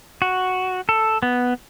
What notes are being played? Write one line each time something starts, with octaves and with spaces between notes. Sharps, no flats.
F#4
A4
B3